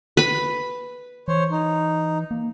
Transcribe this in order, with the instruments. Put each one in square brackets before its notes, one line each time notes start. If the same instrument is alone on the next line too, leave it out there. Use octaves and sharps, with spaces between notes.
[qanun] B4 B5
[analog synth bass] E3 [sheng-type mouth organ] C5 C#5
[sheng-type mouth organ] D#4
[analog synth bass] A#3